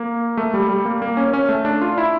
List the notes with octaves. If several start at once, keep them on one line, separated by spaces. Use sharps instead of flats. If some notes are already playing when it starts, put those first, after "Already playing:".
Already playing: A#3
A3
G3
G3
A#3
A#3
C#4
C#4
A3
D4
F4
E4